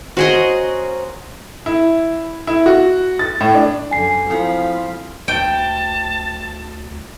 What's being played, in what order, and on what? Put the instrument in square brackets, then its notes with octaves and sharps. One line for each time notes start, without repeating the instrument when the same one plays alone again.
[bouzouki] C#4 A#4 C5 [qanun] F#4 G#4 D#5
[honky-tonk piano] E4
E4
F#4
A6
A2
D4
[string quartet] F#2 D3 [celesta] G#5 C7
[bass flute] F3 [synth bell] C4 E4 A4 [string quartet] F5 B5
[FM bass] D2 [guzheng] G5 [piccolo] A5